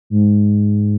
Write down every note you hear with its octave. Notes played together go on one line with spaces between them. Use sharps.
G#2